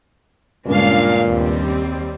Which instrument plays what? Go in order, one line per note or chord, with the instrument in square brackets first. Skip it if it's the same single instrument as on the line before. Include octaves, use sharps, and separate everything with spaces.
[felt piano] C#2 G2 [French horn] A#2 [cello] G#3 [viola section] C#4 D4 F5
[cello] D#2 [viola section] G3 C4